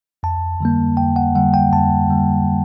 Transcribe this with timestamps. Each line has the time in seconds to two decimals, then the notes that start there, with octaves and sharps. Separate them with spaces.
0.23 F2 A5
0.61 D3 G3 A#3
0.97 F2 G5
1.16 F#5
1.35 D3 G3 A#3 F#5
1.54 G5
1.72 F2 A5
2.09 D3 G3 A#3